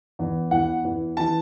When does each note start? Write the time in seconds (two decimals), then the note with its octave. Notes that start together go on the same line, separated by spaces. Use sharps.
0.19 E2 E3
0.51 E2 E3 F#5
0.85 E2 E3
1.17 E3 A5